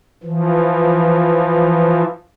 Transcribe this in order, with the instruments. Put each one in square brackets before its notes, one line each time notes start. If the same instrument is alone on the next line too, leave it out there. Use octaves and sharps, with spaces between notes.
[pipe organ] E3 F3